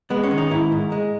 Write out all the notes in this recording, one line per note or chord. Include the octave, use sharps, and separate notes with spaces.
G#3 B3
C#4
D#3
D#4
G#2 E4
G#2
G#3